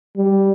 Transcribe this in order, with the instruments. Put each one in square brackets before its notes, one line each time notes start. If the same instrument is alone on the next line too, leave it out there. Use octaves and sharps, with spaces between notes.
[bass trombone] G3